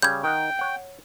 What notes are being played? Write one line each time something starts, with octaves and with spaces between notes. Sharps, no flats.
C#3 G3 G6 G#6
D#3 D#5 F#5 G5
C#5 F#5